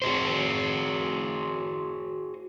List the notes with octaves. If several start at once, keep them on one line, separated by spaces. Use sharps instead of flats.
F#4 G#4 C5